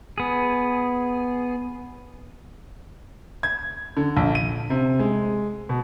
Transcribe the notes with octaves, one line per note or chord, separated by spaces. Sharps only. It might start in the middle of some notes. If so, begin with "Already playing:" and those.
B3 G#4
G#6
D3
A#1
D#7
C3
G#3
B2